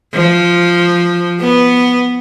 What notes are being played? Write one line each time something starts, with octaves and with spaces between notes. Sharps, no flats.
F3
B3